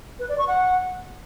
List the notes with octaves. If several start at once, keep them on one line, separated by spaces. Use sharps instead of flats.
B4
D5
C#6
F#5